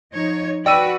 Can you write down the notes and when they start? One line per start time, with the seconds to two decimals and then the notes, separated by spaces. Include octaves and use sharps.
0.12 F3 D#4 C#5
0.66 F#4 B4 D5 G5 E6 D#7